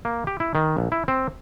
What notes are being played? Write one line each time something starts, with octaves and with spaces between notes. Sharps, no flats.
A#3
G4
E4
D#3
A#1
E4
C4